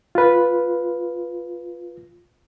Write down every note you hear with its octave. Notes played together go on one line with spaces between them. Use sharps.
F4 B4